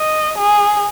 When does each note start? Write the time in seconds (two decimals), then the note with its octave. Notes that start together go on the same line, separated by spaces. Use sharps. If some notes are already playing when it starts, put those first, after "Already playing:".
Already playing: D#5
0.38 G#4